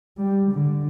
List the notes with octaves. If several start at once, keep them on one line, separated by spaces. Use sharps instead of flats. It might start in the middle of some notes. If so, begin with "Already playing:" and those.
G3
D3